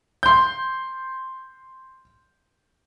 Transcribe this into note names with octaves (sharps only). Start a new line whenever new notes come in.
C6 G6